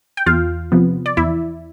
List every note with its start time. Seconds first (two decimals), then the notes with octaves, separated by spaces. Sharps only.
0.17 G5
0.26 E2 F4 F5
0.72 C3 F3 B3
1.06 D5
1.17 E2 E4 E5